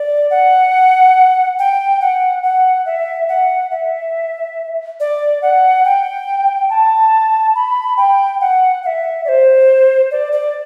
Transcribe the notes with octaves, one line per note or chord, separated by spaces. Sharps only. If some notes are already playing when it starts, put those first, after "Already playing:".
Already playing: D5
F#5
G5
F#5
F#5
E5
F#5
E5
D5
F#5
G5
A5
B5
G5
F#5
F#5
E5
D5
C5
D5
D5